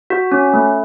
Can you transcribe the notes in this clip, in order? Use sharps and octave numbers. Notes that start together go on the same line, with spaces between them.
F#4
C#4
A3